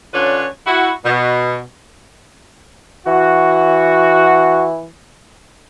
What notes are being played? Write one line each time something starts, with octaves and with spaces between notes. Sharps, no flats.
D3 C#4 D4 F4 B4 C#5
E4 F#4
B2
E3 F#4